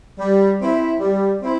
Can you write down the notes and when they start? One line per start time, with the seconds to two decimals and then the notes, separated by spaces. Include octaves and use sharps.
0.19 G3
0.60 C4 E4
1.00 G3
1.42 C4 E4